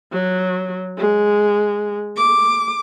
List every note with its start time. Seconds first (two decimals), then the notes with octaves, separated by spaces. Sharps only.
0.12 F#3
0.98 G#3
2.17 D6